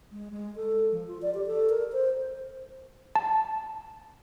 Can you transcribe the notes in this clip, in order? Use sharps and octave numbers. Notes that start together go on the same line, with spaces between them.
G#3
G#3
A4
F3
F4
D5
G4
A4
A#4
C5
A5